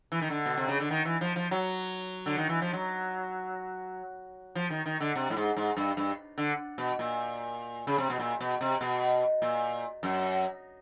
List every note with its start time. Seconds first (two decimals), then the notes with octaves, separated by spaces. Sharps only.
0.12 E3
0.21 D#3
0.30 D3
0.46 B2
0.58 C3
0.68 C#3
0.80 D3
0.91 D#3
1.05 E3
1.21 F3
1.36 F3
1.51 F#3
2.26 D3
2.38 D#3
2.49 E3
2.62 F3
2.73 F#3
4.55 F3
4.70 D#3
4.86 D#3
5.01 D3
5.16 C3
5.30 A2
5.37 G#2
5.57 G#2
5.77 G2
5.97 G2
6.38 D3
6.78 B2
6.99 A#2
7.87 C#3
7.98 C3
8.10 B2
8.19 A#2
8.41 B2
8.61 C3
8.81 B2
9.42 A#2
10.03 F#2